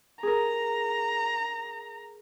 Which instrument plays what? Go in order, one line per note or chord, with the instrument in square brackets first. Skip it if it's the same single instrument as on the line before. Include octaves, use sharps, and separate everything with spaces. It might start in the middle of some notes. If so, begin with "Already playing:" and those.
[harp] G#4 A#4 [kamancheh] A#5